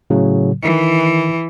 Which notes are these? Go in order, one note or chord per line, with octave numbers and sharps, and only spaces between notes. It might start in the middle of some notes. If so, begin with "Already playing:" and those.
A2 C#3 F#3
D#3 E3 C#7